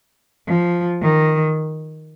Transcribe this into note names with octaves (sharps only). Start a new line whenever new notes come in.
F3
D#3